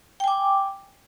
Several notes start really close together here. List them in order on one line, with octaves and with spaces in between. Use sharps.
G5 G#5 D6